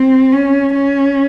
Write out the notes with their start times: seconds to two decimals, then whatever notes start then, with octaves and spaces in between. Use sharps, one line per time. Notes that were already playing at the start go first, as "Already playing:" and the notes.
Already playing: C4
0.32 C#4
0.74 C#4